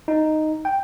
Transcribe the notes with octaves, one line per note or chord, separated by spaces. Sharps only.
D#4
G5